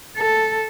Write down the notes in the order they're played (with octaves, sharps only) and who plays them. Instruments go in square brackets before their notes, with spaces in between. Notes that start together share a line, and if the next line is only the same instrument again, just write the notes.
[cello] A4